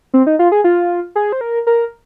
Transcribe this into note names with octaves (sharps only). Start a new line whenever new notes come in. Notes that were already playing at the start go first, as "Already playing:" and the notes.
C4
D#4
F4
G#4
F4
G#4
C5
A#4
A#4